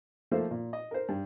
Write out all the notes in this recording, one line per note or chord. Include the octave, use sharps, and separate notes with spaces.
F3 A3 A#3 C5 E5
A#2
D#5
A#4 C5
G2